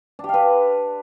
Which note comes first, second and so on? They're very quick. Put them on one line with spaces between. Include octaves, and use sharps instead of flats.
D4 G4 F5 B4